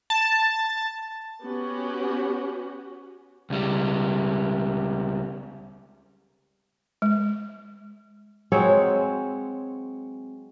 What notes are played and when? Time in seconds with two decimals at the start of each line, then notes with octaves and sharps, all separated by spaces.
0.10 A5
1.45 B3 C#4 F#4 G4
3.50 C#2 G3
7.02 G#3
8.52 F#3 G#3 C4 C#5